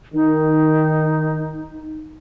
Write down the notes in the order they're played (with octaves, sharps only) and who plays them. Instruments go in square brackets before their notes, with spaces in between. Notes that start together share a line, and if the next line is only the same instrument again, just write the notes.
[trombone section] D#3 [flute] D#4